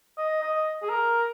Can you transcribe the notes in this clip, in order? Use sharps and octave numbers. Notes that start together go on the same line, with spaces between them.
D#5
D#5
G#4
A#4